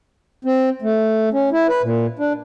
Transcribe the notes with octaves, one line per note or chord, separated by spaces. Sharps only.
C4
A3
C#4
E4
B4
A#2
D4